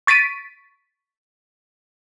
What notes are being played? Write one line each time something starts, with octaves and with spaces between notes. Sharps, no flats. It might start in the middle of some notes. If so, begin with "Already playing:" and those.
C#6 A6 B6 D7 D#7